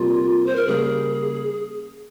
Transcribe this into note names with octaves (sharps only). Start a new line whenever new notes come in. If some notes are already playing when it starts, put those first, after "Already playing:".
Already playing: C3 G3 A#3 F4
C5
A#4
C#3 G3 A#3 G#4